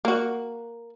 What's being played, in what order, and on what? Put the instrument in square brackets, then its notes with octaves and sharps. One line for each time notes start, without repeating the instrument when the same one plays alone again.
[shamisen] A#3 F#4